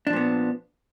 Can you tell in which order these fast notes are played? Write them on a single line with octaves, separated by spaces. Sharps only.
D4 F3 A#2 B3